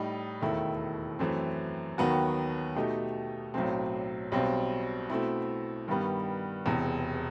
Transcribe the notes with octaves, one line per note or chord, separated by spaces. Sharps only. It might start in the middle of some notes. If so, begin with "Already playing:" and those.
Already playing: A2 G3 D#4
E1 D#2 D#3 A3 E4
F#2 E3 A3 C4
D#2 D#3 F#3 B3 F#4
B2 A3 D#4 G4
B1 A2 F#3 C4
B1 B2 G3 C4
B2 A3 C4 E4
G2 D#3 G3 B3
E1 E2 C3